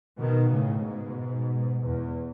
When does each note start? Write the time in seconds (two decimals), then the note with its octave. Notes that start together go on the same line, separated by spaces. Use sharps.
0.19 B2 D#3
0.51 A2 C#3
0.84 G#2 B2
1.82 E2